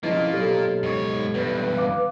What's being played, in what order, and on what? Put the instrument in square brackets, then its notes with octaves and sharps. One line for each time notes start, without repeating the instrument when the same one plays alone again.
[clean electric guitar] F2 C#3 [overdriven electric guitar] A#3 F4 [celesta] E4 B4 D#5
[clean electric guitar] B1 [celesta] G4 A4
[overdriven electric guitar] G#2 C#5
[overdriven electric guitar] E2 G2 [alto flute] B4
[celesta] F5 D6